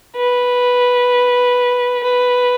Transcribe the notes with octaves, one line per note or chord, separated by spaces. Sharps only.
B4
B4